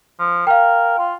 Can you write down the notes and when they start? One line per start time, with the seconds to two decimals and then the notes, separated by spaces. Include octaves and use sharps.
0.19 F3
0.47 A#4 F5 G5
0.98 F4